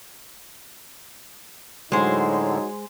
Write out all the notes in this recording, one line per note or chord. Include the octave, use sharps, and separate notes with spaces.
A2 D3 F#3 G#3 D#4 C5